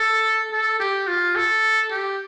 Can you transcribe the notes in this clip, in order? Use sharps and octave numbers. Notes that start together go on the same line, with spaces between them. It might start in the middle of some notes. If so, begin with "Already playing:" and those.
Already playing: A4
A4
G4
F4
A4
G4